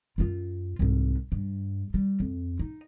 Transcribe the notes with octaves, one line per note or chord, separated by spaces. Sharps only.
F#2 F4
C2 G#2
G2
G3
F2
D#4